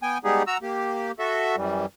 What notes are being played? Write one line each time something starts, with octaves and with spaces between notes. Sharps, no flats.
B3 G5 G#5
G3 G#3 B3 D#4 G4 G#4
F#4 A#5 E6
A#3 G4
F#4 A4 E5
F#2 E3 G3